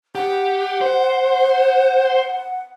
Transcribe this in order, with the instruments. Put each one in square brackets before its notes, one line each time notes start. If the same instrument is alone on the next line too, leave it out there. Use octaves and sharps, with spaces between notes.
[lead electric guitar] G4 [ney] F#5
[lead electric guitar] C5